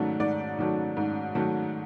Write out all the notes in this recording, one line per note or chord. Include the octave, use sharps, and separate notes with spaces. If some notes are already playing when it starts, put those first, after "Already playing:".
Already playing: G#2 D#3 F#3 A3 D5
G#2 D5
D#3 F#3 A3
G#2
D#3 F#3 A3